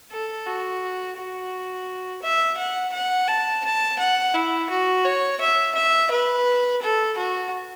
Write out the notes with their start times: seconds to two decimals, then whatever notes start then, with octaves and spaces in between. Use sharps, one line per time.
0.11 A4
0.46 F#4
1.17 F#4
2.23 E5
2.57 F#5
2.93 F#5
3.28 A5
3.64 A5
3.99 F#5
4.34 E4
4.70 F#4
5.05 C#5
5.40 E5
5.75 E5
6.11 B4
6.82 A4
7.17 F#4